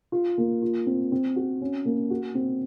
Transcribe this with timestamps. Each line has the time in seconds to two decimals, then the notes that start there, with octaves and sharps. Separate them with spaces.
0.12 F4
0.38 A#3
0.62 F4
0.87 C4
1.12 C4
1.36 F#4
1.61 C#4
1.85 A#3
2.10 F#4
2.35 C4